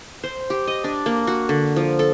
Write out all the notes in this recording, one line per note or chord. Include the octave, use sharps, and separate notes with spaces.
C5
G4
D#5
D4
A#3
F#4
D3
F3
A4